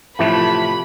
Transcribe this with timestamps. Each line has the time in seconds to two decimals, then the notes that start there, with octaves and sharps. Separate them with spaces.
0.19 A2 C3 E3 F3 A3 B4 B5